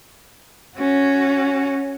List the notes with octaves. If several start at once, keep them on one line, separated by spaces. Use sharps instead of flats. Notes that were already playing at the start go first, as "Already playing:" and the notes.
C#4 F#4